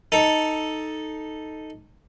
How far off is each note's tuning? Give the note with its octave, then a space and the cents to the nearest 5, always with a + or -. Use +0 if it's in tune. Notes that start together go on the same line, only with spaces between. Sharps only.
D#4 +0 A4 +0